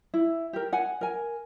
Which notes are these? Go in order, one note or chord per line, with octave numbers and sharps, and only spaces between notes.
E4
G4 A#4
F#5 G#5
A#4 G#5